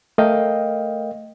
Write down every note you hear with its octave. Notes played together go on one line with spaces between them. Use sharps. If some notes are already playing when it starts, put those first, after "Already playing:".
A3 A#4 D#5 F5 G5